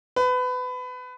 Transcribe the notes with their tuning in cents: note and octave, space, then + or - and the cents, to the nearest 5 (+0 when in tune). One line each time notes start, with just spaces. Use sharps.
B4 +25